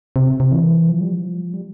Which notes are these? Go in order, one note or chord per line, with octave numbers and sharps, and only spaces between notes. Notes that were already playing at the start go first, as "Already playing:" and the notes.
C3
C3
E3
F3
G3
F3
G3